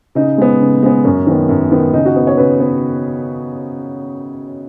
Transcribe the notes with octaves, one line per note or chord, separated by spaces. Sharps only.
C#3 D#4
G#3 B3
C#3
G#3 B3
F#2 C#4
D#3 B3
F#2
D#3 B3
C#3 D#4
F#4
B3
C#5
C#3 B4
B3